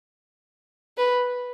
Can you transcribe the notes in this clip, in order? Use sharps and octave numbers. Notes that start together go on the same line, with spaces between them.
B4